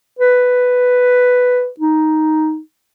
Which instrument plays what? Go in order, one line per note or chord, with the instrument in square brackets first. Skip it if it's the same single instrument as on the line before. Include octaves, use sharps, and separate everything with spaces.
[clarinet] B4
D#4